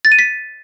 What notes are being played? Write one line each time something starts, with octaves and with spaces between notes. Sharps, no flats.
A6
D#7
B6